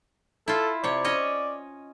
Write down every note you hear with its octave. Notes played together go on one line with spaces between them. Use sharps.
E4 F4 A4
C3 C#5 D5
C#4 C#5 D#5